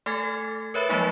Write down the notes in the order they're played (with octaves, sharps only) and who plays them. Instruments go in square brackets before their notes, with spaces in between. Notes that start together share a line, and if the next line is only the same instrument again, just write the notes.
[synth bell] A3 A4 G#5 G#6 A6
A4
A#4 B4 C#5 E5 B5 A6
F3 F#3 G#3 A#3 D#4